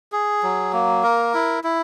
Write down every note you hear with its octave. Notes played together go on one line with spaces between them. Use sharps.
G#4
F#3
A#3
A#4
E4
E4